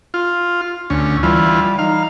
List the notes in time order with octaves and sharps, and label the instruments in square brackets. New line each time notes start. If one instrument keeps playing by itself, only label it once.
[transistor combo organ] F4
D2 C#4
[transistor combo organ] E3 F4 [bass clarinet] G3
[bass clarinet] D#4 [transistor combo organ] F5